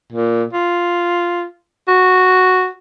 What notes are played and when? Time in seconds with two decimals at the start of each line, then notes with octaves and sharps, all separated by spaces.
0.13 A#2
0.53 F4
1.88 F#4